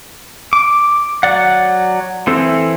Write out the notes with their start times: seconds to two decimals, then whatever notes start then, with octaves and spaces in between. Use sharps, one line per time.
0.53 D6
1.23 F#3 D5 F#5
2.27 E3 C4 A4